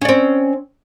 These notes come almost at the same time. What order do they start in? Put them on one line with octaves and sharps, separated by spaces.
C#4 D5 C4